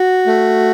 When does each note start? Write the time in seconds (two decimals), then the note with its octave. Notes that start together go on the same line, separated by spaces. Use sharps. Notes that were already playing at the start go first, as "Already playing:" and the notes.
Already playing: F#4
0.27 A3